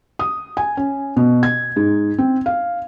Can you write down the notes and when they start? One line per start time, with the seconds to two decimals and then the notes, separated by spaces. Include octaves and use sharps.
0.19 D#6
0.57 G#5
0.77 C#4
1.17 B2
1.43 G#6
1.76 G#2
2.18 C4
2.46 F5